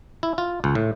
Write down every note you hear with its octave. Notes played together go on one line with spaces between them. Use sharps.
E4
F4
C#2
A2